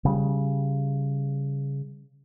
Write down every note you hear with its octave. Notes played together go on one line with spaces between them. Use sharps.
C#3 G3